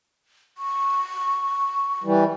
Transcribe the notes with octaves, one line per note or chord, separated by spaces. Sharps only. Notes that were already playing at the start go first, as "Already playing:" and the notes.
C#6
E3 G3